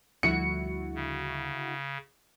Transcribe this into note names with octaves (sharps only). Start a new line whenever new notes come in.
D2 D3 F3 G3 E4 F#4 C#7
C#3